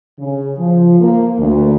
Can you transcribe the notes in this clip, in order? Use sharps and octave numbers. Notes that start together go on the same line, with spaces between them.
C#3
F3
A#3
D2